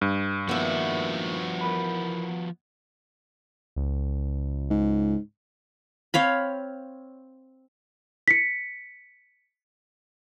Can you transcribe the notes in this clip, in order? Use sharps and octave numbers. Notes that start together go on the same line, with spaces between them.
G2
D#3 F3 G#3 A#3 B3 F#4 E5
E2 A#4 B5
C#2
G#2
C4 C#5 F5 B5
B6 C#7